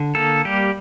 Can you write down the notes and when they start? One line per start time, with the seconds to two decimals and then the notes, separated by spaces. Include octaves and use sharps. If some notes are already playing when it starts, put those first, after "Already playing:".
Already playing: D3
0.15 A#3 A4
0.45 G3 G4